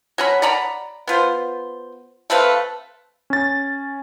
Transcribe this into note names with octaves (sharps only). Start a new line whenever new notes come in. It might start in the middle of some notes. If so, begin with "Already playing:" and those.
F#3 C#4 B5
D5 F#5 A#5 B5
B3 F4 C5
A3 C4 B4 F5
C#4 A6